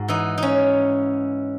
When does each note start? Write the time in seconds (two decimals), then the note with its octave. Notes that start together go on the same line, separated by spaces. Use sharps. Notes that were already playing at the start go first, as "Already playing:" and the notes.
Already playing: G#2 F#4 G#4
0.08 E3 D#4
0.38 C#4 D#4